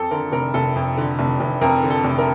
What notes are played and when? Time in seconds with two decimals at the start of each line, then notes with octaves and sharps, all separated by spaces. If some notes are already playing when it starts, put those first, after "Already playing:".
Already playing: F2 A4
0.11 D3 A#4
0.32 F1 A#4
0.54 F1 A4
0.76 F2
0.97 D3
1.19 F1
1.40 F1
1.61 F2 A#4
1.83 D3
1.90 A4
2.04 F1
2.19 A#4